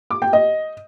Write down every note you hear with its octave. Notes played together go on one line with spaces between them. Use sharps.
D6
G5
D#5